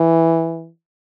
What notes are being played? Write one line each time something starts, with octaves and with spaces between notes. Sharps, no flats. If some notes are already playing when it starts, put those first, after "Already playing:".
Already playing: E3